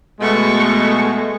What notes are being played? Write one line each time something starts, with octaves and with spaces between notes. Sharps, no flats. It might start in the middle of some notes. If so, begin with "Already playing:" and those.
B2 G#3 A3 A4 E5 C#6